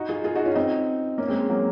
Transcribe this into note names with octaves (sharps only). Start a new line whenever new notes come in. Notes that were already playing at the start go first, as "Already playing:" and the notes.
Already playing: D#4 F#4
F4 G#4
F4 G#4
D#4 F#4
C#4 F4
C4 D#4
A#3 C#4
G#3 C4
F#3 A#3